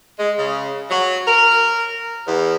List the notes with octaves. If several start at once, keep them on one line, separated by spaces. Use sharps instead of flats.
G#3
C#3
F#3
A#4
E2